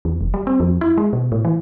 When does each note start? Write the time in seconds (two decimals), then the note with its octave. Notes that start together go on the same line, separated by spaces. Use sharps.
0.05 E2
0.21 F1
0.34 G3
0.47 C4
0.60 F2
0.81 E4
0.98 G#3
1.13 B2
1.32 A2
1.45 E3